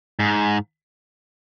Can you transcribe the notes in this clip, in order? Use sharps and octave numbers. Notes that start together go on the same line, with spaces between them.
G#2